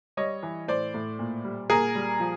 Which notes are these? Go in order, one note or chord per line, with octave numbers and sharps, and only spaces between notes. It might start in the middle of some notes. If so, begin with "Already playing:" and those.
G3 C#5 D#5
E3
A2 C5 D5
A2
A#2
G3
A#2 G#4 A#4
G3
F3